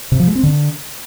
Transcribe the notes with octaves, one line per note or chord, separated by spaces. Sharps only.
C3
F3
G#3
C4
D3